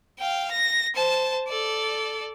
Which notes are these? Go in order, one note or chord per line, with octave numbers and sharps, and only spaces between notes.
F5 G5
A#6
C5 A5
A4 D5